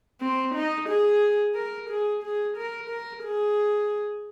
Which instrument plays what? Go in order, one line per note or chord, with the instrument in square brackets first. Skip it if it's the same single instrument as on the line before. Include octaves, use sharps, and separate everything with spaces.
[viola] C4
D#4
G#4
A#4
G#4
G#4
A#4
A#4
G#4